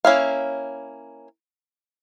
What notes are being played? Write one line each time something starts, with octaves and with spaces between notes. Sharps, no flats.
A#3 C#4 E4 F5